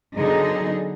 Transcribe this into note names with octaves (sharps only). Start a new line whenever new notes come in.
D3 F#3 B3 D#4 G#4